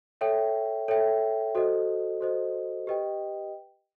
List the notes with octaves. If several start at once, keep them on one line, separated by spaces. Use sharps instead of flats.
A4 C#5 E5 G5
A4 C#5 E5 G5
F#4 A4 C5 D#5
F#4 A4 C5 D#5
G4 B4 D#5 G5